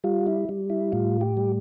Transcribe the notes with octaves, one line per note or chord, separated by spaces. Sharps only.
G3 F4
E4
G3
E4
A2 F4
G4
G3